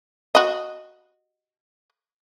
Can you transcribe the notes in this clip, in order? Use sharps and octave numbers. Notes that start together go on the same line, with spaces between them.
F#4 D#5